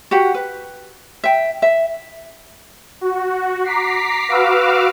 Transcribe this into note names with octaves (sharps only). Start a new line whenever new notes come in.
F#4 G4 F#5
B4
E5 G5
E5
F#4
A#5 D6 B6 C7
F#4 B4 F5 D6 E6 F6